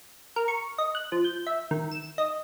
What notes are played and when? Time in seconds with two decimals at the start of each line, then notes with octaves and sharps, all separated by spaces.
0.36 A#4
0.48 C#6
0.78 D#5
0.95 F#6
1.12 F3
1.24 G6
1.47 E5
1.71 D#3
1.92 E7
2.18 D#5